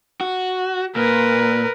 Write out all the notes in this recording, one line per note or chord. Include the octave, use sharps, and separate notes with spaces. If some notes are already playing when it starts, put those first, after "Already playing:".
F#4
A#2 A#4 B4